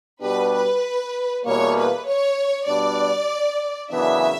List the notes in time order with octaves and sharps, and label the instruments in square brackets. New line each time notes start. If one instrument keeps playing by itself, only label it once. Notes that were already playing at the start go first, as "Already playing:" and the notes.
[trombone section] B2 G3 B3 D4 G4 [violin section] B4
[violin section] B4
[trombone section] E2 B2 G3 A#3 [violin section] C#5
[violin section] B4
C#5
[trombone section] B2 G3 B3 D4 [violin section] D5
[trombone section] F#2 C#3 E3 B3 D4 [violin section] E5